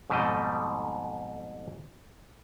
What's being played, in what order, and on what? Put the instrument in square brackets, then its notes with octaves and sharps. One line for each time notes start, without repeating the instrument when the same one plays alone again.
[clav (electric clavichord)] F2 G#2 B2 G3 A3 D#5